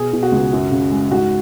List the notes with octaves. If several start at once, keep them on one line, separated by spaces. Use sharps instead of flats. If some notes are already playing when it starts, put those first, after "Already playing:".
Already playing: B2 G#4
B2
F#4
C#2
F#2
C#3
G#3
G#2 F#4